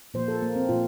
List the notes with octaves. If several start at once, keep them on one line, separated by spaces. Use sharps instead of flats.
A#2 F3 A#3 C5
A4
A#3
C4
A#2 F3 A#3 F4